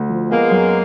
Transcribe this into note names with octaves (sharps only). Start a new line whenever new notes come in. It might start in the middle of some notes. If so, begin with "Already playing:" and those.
Already playing: D2
F3
G#3 A#3 B3
F#2